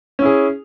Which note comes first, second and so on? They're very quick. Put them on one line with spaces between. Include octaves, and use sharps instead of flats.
C#4 E4 G#4